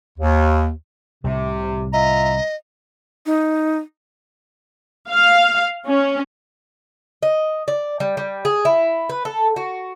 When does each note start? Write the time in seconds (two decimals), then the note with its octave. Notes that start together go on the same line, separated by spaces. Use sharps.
0.19 D#2
1.24 C2 A2 C3
1.93 F4 D#5 E5 A#5
3.26 D#4
5.10 F5
5.87 C#4
7.22 D#5
7.68 D5
8.00 G3
8.17 G3
8.45 G#4
8.65 E4
9.10 B4
9.25 A4
9.56 F#4